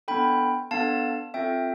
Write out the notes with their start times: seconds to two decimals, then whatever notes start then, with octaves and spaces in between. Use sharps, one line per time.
0.08 B3 D4 A4 G5 B5
0.71 B3 D4 A4 F5 A5
1.34 C4 F4 A4 E5 G5